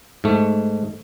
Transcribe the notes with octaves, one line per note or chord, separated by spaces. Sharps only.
G#2 A3